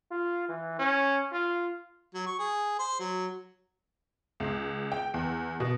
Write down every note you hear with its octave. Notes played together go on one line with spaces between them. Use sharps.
F4
E3
C#4
F4
F#3
C#6
G#4
C5
F#3
C#2
G5
E2
B2